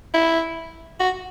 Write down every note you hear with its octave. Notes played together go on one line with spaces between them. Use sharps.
E4
F#4